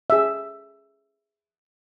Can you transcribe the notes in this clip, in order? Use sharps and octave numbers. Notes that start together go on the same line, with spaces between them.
G#4 E5